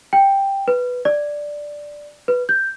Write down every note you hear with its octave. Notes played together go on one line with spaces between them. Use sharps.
G5
B4
D5
B4
G6